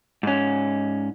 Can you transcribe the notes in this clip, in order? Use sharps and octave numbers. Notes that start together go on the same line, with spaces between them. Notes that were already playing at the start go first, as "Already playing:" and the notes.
G#2 C#4